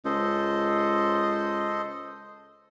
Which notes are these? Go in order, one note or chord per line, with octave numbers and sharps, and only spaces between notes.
C#2 A4 C5 D#5